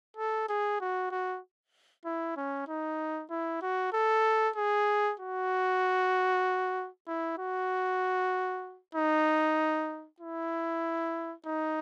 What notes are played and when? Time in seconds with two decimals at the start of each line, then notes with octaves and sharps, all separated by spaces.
0.17 A4
0.49 G#4
0.80 F#4
1.11 F#4
2.05 E4
2.36 C#4
2.68 D#4
3.30 E4
3.62 F#4
3.93 A4
4.56 G#4
5.19 F#4
7.08 E4
7.38 F#4
8.95 D#4
10.21 E4
11.46 D#4